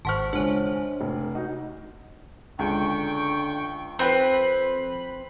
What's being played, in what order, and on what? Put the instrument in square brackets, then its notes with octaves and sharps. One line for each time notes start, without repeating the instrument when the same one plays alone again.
[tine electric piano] G#1 C#6 [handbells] C5 F#5 A5 [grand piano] C6 F6
[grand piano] C#2 G#3 [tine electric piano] D4 [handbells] C5 C#5
[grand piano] F1
D#4 F#4
[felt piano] C#2 [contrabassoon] D3 [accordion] G5 C#6
[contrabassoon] F2 [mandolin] C4 B4 [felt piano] G5 G6 [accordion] B5